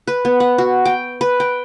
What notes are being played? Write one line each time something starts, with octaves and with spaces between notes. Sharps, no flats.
B4
B3
F#5
F#4
G5
B4
G5